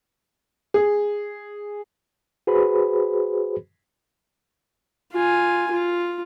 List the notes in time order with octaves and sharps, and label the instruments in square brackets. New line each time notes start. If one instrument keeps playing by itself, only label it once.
[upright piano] G#4
[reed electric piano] F#4 G#4 B4 C5 B5
[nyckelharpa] F4 G#5
F4